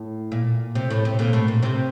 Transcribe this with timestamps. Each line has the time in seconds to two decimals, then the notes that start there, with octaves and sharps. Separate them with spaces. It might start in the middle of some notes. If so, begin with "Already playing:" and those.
Already playing: A2
0.32 A#2
0.75 C3
0.90 A2
1.05 C3
1.19 A#2 D3
1.33 A2
1.48 A#2
1.63 C3